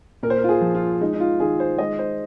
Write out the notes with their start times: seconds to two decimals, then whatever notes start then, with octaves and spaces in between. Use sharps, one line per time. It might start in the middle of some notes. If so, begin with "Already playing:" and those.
0.23 A#2 A#4
0.30 C5
0.38 A#4
0.44 F4
0.49 G#4
0.61 F3
0.75 F4
1.01 G#3 D#4
1.14 D#4
1.20 F4
1.40 D#3 G#4
1.60 C5
1.78 G#3 D#5
1.99 C5